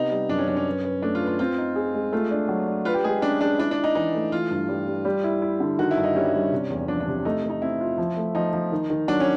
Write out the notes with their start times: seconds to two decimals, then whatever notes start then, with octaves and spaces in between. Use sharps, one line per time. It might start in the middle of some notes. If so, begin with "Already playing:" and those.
Already playing: C3 B3 D#4
0.11 G3
0.29 F#2 D4
0.38 C#4
0.47 F#2 D4
0.57 C#4
0.66 B4
0.84 B4
1.02 A3 D4
1.15 F4
1.21 B4
1.27 F4
1.39 C4 F4
1.58 D#4
1.76 G#4
1.94 G#3
2.12 A3 F4
2.31 D4
2.49 F#3
2.67 D4
2.85 F4 B4
2.94 G4
3.04 G#3 G#4
3.22 C#4 D4
3.41 G#3 D4
3.59 D4 E4
3.71 D4
3.78 E4
3.84 D#4
3.95 E3 D#4
4.14 A3
4.32 E3 F4
4.51 G2
4.69 G3
4.87 G3
5.05 G3
5.24 E4
5.42 E4
5.60 D3
5.78 D#3 F#4
5.91 E4
5.97 G2
6.03 D#4
6.15 G3 C#4
6.34 G3
6.52 C3
6.70 E2
6.88 F3 D4
7.00 D4
7.07 C3
7.25 A3 D#4
7.43 A3
7.50 D#4
7.62 C4 E4
7.81 F4
7.98 F3
8.17 A3
8.35 F3 D#4
8.53 F3
8.72 D#3
8.90 D#3
9.08 F#3 D4
9.20 C#4